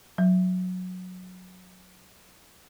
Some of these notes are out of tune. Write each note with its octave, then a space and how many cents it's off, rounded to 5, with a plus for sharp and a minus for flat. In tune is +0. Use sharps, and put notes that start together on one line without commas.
F#3 -15